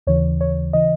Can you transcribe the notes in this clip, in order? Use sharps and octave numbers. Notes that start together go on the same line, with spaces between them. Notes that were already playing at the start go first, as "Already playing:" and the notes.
D#2 C#3 E3 C#5
C#5
C#3 E3 D#5